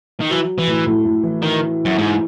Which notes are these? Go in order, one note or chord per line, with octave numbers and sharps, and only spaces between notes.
D#3
E3 F#3
E3
A2
A2
A2
E3
D#3
F#2
G#2